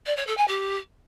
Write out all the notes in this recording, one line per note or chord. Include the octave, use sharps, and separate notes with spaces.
D5
C#5
A4
G#5
G4